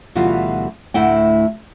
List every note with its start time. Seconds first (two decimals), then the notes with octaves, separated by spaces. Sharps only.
0.15 D2 B2 E3 G3 F4 F#5
0.94 D2 A2 E4 F#5 G5